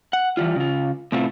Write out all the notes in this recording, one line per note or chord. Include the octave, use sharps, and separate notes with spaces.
F#5
E3 F3 G3 F4
C#3 F4
A2 C3 A3 B3 C4 F4